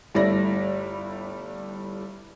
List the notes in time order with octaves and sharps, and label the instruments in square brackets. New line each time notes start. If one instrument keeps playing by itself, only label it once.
[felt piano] G1 G3 A3 E4 D5 A#6